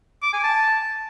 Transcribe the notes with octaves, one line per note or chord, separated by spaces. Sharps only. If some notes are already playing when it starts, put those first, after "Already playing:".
D6
G#5
A5